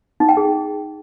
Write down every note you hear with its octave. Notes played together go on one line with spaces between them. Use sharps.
D#4
G5
G#4